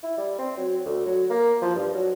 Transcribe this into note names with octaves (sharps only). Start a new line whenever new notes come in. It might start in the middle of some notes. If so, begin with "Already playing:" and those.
E4
G3
C4
F#3
D2
F#3
A#3
F3
G2
F#3